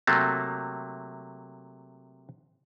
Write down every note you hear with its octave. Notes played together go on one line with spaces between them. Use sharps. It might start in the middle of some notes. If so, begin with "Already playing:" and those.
C3 F#3 A3 A#3